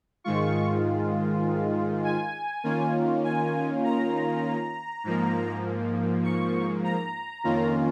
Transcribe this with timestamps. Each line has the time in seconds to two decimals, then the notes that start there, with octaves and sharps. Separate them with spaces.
0.24 G#2 D#3 G#3 F4 C#6
2.04 G#5
2.64 D#3 A#3 C#4 F4
3.24 G#5
3.84 A#5
5.04 G#2 F3 A#3
6.24 C#6
6.84 A#5
7.44 F2 D#3 A#3 C#4 F4